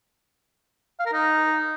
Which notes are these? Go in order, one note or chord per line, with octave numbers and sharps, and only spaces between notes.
F5
A#4
D#4